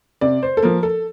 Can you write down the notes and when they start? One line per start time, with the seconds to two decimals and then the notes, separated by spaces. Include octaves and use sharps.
0.21 C3 D5
0.43 C5
0.57 A4
0.63 F3 A#3 A#4
0.83 A4